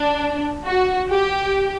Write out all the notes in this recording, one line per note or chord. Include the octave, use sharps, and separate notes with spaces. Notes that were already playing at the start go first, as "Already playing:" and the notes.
Already playing: D4
F#4
G4